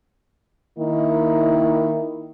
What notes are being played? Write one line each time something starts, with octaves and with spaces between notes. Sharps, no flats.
D#3 A#3 D#4 E4